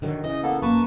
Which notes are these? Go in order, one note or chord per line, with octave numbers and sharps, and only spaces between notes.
D3 D#3 F#3
C#3 E3 D#5 D#6
A#3 B3 A4
F#2 A#3 B4 A5 C#6